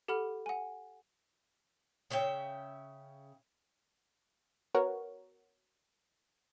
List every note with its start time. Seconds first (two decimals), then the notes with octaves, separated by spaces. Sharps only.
0.08 G4 A4 F#5 B5 F6
0.46 F#5 G#5
2.10 C#3 C#4 E5 G5
4.74 B3 F#4 A#4 C#5